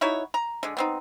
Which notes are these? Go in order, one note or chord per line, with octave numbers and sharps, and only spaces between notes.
D#4 E4 F#4 C#5
A#5
D3 G#3
B3 C4 D#4